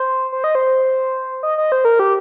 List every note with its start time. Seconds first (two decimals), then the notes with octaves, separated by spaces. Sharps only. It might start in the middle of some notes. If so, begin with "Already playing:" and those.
Already playing: C5
0.32 C5
0.44 D#5
0.55 C5
1.43 D#5
1.58 D#5
1.72 C5
1.85 A#4
1.99 G4